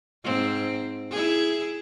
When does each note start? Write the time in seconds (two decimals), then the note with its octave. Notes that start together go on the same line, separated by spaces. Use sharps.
0.24 G#2 C4
1.11 E4 G#4